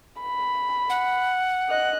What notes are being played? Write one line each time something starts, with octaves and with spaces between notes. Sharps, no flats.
B5
F#5
D#5 F#6